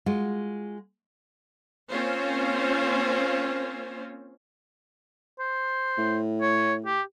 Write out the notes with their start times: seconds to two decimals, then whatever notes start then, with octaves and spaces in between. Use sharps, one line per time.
0.06 G#3 F4 F#4
1.90 A#3 C4 C#4 F4 C5
5.39 C5
5.98 A2
6.42 C#5
6.86 G4